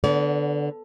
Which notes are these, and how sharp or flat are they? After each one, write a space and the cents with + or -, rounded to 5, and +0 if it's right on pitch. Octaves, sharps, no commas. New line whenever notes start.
D3 +0 B3 +0 D5 -45